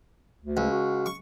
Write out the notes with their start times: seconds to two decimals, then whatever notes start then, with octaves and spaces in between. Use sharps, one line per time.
0.41 D2
0.57 C#2
0.71 F#4
1.06 C#6